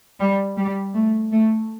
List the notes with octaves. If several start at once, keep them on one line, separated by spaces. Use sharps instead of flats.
G3
G3
A3
A3